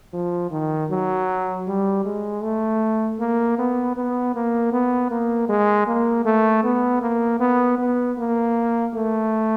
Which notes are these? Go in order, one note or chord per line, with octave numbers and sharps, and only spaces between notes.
F3
D#3
F#3
G3
G#3
A3
A#3
B3
B3
A#3
B3
A#3
G#3
A#3
A3
B3
A#3
B3
B3
A#3
A3